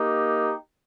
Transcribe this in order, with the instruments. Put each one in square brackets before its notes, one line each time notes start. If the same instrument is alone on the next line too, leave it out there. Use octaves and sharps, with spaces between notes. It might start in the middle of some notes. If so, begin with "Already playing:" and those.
Already playing: [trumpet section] A#3 D#4 G4